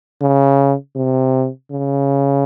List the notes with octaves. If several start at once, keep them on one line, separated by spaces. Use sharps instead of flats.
C#3
C3
C#3